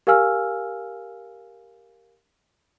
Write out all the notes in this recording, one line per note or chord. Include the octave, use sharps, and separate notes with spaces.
G4 A#4 F5 G#5 E6 F6